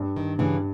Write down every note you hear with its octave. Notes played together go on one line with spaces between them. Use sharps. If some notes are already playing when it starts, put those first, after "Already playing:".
Already playing: G2
D#3
G2 C#3 E3